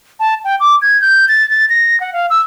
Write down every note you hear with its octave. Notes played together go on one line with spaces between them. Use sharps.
A5
G5
D6
G#6
G6
A6
A6
A#6
F#5
F5
E6